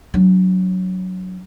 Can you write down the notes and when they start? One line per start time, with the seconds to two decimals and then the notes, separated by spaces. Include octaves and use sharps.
0.14 F#3 D4